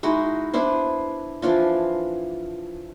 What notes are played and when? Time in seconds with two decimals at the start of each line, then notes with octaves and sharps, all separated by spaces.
0.03 G#3 D#4 E4 F#4
0.53 B3 D4 E4 C5
1.42 E3 F3 D4 F4